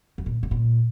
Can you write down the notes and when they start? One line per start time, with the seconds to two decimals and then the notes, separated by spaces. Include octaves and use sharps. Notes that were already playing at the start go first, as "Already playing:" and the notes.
0.18 F2
0.26 A#2
0.43 A2
0.51 A#2